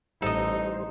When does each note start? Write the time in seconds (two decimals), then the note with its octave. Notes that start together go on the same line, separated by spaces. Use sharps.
0.22 A1 G3 D#4 A4 C5 D#5